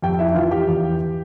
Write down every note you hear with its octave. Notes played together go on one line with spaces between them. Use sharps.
F2 G4 G5
E4 E5
E3 F4 F5
G4 G5
E2